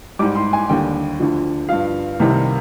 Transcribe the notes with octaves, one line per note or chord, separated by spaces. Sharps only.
G#2 G3 D6
C6
G#5
D#2 D3 G3 G5
D2 D3 F3
G2 F3 F5
C2 C3 D#3 G3